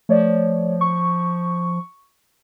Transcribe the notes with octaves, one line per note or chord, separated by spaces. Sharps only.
F3 A3 C#5 D5
C#6